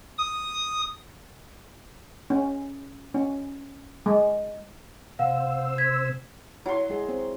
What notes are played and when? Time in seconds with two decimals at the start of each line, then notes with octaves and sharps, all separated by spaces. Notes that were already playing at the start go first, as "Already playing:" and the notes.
0.18 D#6
2.30 C#4
3.14 C#4
4.06 G#3
5.19 C3 C5 F5 F#5 E6
5.78 G#6 B6
6.66 F#3 E4 C6
6.89 G#3 G#4
7.09 C4